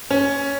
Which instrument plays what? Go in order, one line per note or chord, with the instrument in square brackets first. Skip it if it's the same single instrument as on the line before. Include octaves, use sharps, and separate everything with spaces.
[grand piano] C#4